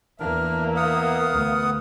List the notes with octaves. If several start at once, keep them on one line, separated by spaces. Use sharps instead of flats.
E2 A#3 D4 A#4 E5
B3 F5 F#5 D#6
D2